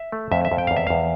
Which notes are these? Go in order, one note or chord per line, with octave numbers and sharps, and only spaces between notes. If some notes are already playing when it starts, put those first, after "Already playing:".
Already playing: E5
A3
F2 E5
E5
F2
G5
E2 F5
E5
E2 F5